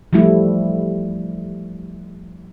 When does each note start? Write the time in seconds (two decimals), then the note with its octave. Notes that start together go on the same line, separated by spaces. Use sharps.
0.13 F3 G3 A3 E4